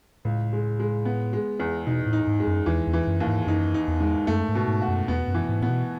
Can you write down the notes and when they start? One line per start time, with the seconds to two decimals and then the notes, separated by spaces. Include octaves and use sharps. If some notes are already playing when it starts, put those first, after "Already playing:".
0.25 C#2 A2
0.53 G#3
0.80 G#3
1.05 B3
1.33 G#3
1.60 E2
1.86 B2 D#4
2.06 A2
2.13 D#4
2.27 G#2
2.40 G#3
2.47 F#2
2.66 E2 E3
2.87 E2
2.93 E3
3.07 F#2
3.20 D#2
3.27 G#2
3.47 F#2 D#4
3.74 D#4
3.88 E2
4.00 G#2
4.27 F#2 A3
4.48 G#2
4.55 B2
4.68 G#2
4.82 F#4
4.88 F#2
5.08 E2 B3
5.28 F#2
5.34 E3
5.49 G#2
5.62 A2 B3
5.69 B2